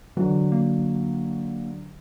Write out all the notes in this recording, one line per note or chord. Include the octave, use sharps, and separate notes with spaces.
D3 E3 F#3
A#3